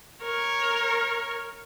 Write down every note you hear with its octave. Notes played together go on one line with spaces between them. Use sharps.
A#4 C#5